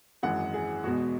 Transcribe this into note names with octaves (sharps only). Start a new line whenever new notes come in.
G#1 F#2 E3 G#3 F#5
G#4
E2 B2 G#3 F#4